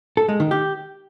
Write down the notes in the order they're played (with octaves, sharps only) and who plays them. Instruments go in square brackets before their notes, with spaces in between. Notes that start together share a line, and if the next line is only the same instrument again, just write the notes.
[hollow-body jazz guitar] A4
G#3
D#3
G4